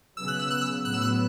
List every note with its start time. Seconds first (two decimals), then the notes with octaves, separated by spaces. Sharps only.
0.17 C#3 F#3 B3 E6
0.28 F#6
0.39 E6
0.50 F#6
0.61 E6
0.85 A2 F#3 B3 F#6
0.94 E6
1.02 F#6